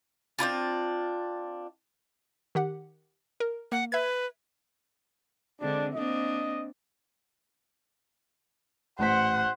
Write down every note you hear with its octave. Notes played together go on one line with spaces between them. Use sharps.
C4 D4 E4 F4
D#3 G4 F#5
A#4
A#3 F#5
B4 E5 G#6
D3 G#3 C4 D4
A#3 C4 D4 D#5
D#1 A1 C5 F#5 B6